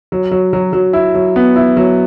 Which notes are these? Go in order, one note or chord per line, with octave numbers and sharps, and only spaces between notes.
F#3
F#3
F#3
F#3
E4
F#3
B3
E4
F#3